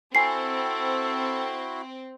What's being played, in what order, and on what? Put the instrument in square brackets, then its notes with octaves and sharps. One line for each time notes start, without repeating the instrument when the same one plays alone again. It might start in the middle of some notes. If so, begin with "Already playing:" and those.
[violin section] C4 [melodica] E4 F#4 B5 [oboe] A4 [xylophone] G#5 C7